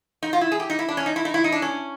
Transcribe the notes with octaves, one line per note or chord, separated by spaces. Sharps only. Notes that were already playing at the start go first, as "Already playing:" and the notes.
D#4
F4
E4
G#4
G4
D#4
E4
D4
C#4
D#4
E4
D#4
E4
D#4
D4
C#4